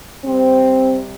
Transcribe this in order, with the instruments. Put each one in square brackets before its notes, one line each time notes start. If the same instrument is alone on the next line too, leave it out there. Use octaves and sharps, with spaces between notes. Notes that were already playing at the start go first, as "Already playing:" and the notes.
[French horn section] C3 G3 C4